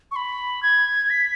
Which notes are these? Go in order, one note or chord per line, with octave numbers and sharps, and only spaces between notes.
C#6
B5
G#6
B6